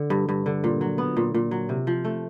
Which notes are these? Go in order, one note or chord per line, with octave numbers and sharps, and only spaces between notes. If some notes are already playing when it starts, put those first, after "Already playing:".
Already playing: D3
G2
G2
D3
A#2
F#3
B3
A#2
A#2
F#3
C3
F3
A3